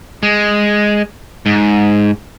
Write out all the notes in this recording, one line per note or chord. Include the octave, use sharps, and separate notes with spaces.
G#3
G#2